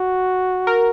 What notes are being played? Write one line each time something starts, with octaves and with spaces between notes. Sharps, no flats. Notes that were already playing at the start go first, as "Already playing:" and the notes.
Already playing: F#4
A#4